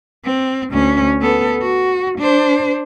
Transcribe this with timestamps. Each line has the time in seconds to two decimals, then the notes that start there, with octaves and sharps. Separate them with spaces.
0.24 C4
0.71 D2 C#4
1.21 B3 A4
1.61 F#4
2.19 D4 C5